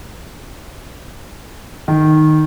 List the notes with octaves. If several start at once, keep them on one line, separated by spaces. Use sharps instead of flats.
D#3